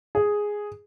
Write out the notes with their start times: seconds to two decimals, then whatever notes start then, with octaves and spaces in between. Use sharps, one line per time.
0.15 G#4